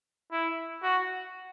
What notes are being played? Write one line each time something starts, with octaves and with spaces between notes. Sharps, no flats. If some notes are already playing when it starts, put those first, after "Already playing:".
E4
F#4